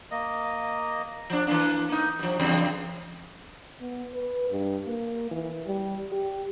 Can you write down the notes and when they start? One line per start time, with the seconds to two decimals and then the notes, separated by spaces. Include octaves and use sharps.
0.11 A#3 D#5
1.30 F3 D4
1.47 E3 A#3 D4
1.89 A#3 D#4
2.19 G2 F3
2.39 E2 G2 C#3
3.81 B3
4.14 B4
4.50 G2
4.87 A#3
5.31 E3
5.67 G3
6.12 G4